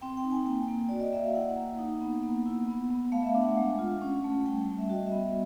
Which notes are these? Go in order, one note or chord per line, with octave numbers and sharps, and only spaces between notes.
C4 G5
G5
D#4
G#5
A#3 G5
A#3
F#4 D5
D#5
A#3 E5
F5
E4 F#5
A#3
D#4
B3
A#3
E4
B3
B3
A3 F5
E5
F5
D4
F#5
G#3
F4
C#4
A3
G3 G5
G5
G3
E5
F#4 D#5
E5
B3